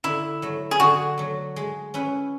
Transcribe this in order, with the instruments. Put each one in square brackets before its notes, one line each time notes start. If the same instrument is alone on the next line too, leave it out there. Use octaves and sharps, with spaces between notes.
[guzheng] D3 [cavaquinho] E4
[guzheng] F#3 A3
[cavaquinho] G#4
[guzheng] D3 [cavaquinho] F#4
[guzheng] F#3 A3
G#3
C#4 E4 B4